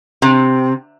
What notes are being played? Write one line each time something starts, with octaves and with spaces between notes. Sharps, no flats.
C3